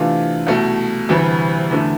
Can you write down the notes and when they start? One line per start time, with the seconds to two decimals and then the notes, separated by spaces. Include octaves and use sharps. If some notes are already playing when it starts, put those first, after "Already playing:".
Already playing: C3 E3 A3 D4 F4
0.47 C2 B2 A3
1.09 D2 C3 E3 G3
1.71 E2 D3 A3 E4